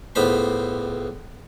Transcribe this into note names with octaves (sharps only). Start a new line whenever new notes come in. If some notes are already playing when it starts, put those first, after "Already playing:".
C#2 A2 B3 C5 B5 C6